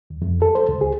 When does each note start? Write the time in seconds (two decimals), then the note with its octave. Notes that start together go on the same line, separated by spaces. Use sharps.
0.10 D#2
0.22 F2
0.42 A4
0.55 C5
0.69 C#2
0.81 G#4